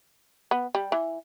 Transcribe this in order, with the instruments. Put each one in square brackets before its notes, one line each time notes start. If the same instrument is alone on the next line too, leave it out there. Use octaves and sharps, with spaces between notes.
[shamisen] B3
G3
E3